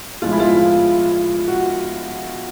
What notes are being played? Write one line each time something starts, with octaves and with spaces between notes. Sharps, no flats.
B1 A2 F3 G#3 F4
E4
F4
F#4